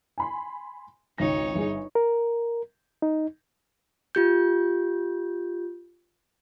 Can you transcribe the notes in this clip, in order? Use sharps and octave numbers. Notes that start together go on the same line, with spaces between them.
G#5 B5 C6
G#1 C#2 D#4 C#5 A#6
G1 G#4
A#4
D#4
F4 G4 G6